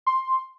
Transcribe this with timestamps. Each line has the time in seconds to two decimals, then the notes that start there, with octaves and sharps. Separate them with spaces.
0.06 C6